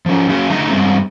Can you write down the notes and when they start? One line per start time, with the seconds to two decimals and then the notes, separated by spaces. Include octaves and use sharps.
0.06 F3 C#4
0.29 F#3 C#4 F#4 G#4 F5
0.50 D3 A3 D#4 E4 A#5
0.70 G2 A#2 G3 G#3 C4